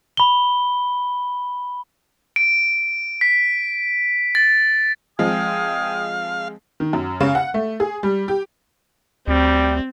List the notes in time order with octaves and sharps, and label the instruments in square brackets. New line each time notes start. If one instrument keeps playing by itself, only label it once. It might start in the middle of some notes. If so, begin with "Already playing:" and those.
[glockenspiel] B5 G7
[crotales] D7
B6
A6
[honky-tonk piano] F3 G#3 C4 [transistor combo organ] F5 [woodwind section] G5 G#5 D#6
[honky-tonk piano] D#3
F#2
C#3
F#5
A3
G#4
G3
G4
[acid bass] D2 [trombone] G3 [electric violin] C4